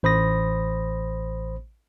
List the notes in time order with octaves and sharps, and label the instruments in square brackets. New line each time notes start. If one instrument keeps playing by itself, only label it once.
[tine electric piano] A1 C5 B5 D#6 A#6